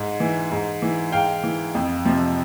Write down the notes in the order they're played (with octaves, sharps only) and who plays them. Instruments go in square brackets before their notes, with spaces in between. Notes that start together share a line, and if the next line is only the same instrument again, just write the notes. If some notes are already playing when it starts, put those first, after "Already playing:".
Already playing: [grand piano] G#2
E3
G#2
E3
G#2 F5 G5
E3
F2
C3 F3